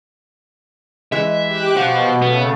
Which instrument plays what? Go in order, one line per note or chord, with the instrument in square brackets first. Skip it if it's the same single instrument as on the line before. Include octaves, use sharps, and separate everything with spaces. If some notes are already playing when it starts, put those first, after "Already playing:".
[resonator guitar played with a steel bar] E3 G#3 [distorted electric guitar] E5
[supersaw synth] G4 D6 F#6
[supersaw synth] B2 [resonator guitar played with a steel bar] F#4 [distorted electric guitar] C5 F5
[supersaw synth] C#3 A3 [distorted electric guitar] B3